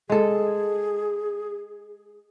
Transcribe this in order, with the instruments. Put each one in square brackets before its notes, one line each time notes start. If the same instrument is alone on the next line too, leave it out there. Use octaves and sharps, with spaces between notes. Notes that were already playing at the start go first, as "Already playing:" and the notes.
[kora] G#3 A4 [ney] G#4